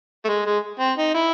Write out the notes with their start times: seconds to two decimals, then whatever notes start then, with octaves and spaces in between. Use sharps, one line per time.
0.25 A3
0.28 G#3
0.46 G#3
0.80 C4
0.98 D#4
1.15 E4